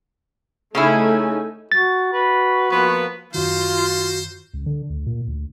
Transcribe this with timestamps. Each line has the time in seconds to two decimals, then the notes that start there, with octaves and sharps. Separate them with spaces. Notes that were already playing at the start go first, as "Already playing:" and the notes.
0.75 C#3 A3 C#4 D#4 E4 G#5
1.72 F#4 A6
2.13 F#4 B4
2.71 F3 A#3 B3 B4
3.34 F#2 D#3 F4 F#4 C5
4.54 C#2
4.66 D3
4.90 D2
5.06 A#2
5.28 D2